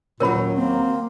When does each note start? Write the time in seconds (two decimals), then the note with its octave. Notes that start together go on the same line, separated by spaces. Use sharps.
0.20 D#2 A#2 F#3 C#4 A#4 C#5 B5
0.57 A#3 C4